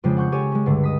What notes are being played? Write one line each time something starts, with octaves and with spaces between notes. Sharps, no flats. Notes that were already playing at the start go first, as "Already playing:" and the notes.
F2 C#3 G#3 D4 G5
F#5 C#6 G6
C#4 G4 A4 C#5 G#5
G#3 C#4
C#2 G2 D3
D#5 D#6 B6